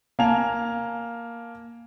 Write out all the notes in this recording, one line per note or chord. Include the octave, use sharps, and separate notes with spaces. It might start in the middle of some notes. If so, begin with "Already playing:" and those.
A#3 G#5 A5 F7